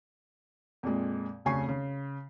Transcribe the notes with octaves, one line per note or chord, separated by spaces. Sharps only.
F2 A#2 G#3
F1 D2 C#3 G#5 C#6 C7
C#3